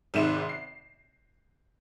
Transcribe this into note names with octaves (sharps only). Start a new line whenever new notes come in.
G#1 G#2 C3 D#3 E5 E7
C7